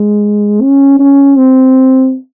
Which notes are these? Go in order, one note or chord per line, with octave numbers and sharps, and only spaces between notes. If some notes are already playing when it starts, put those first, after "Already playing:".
Already playing: G#3
C#4
C#4
C4